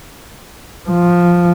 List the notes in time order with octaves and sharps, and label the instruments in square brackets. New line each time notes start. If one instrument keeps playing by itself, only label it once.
[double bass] F3